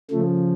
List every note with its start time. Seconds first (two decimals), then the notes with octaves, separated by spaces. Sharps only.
0.11 C#3 F3 A3